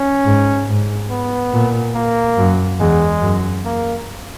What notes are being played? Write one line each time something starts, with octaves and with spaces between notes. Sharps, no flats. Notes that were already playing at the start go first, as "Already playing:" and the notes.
Already playing: C#4
G#2
G#2
B3
A#2
A#3
F#2
E2 G#3
F#2
A#3